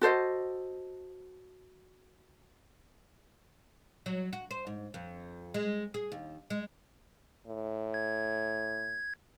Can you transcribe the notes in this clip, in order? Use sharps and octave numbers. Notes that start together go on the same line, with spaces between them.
F#4 A4 C5 D#5
F#3
F#4
C5
G#2
F2
G#3
G#4
D#2
G#3
A2
G#6